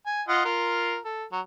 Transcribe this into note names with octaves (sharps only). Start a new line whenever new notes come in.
G#5
F4 D#5 F#5
F4 A#4
A4
F#3